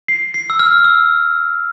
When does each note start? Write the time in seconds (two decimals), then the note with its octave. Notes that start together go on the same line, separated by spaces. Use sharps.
0.08 C7
0.34 C7
0.50 E6
0.59 F6
0.84 E6